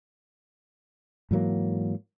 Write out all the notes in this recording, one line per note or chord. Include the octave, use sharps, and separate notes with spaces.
G#2 E3 F#3 A#3